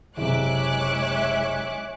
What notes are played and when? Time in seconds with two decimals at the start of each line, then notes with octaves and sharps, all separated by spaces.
0.17 F#1 C3 G#3 C#5 E5 D6 F#6